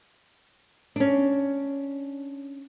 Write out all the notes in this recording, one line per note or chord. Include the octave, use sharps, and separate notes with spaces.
C#4 D4